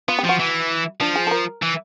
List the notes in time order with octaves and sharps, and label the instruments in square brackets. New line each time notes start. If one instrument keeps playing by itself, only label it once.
[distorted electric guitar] B3 [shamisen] F4
[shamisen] G4
[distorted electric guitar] F3 [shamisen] F#4
[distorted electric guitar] E3
[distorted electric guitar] F3 [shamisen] D4
[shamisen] G#4
A4
A#4
[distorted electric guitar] E3